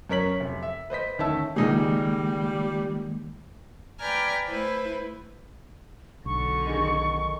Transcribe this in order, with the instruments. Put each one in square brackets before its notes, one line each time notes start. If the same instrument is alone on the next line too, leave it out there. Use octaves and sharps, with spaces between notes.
[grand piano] F#2 C#4 A#4 C#5 B6 F#7
F1
E5
B4 C5 D#5 B6
D2 D#3 C#4 E5 A5 E6
[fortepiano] C#2 D#4 G#4 [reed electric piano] D#3 G#3 A#3 [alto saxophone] G3
[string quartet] B4 D5 G5 G#5 A#5 F6
A3 E4 B4 C5
[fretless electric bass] B1 [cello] D3 [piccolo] C#6
[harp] D#3 G#4